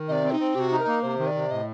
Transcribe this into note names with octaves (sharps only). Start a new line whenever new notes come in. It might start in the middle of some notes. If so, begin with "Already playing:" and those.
Already playing: D#3
C3 D5 D#5
C4
D#4
C4
C3 F#4 G4
D#4
A#4
A#3
C3 C5
D#3
D5
C3
A2 D#5